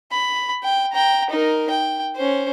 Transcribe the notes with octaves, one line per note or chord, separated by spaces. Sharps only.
B5
G5
G5 A#5
D#4 A#4
G5
C#4 C5